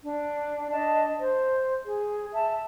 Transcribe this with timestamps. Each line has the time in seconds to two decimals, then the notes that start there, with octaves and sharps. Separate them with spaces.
0.03 D4
0.71 D4 D#5 A5
1.20 C5
1.86 G#4
2.33 E5 A5